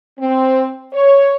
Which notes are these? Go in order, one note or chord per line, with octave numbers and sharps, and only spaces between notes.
C4
C#5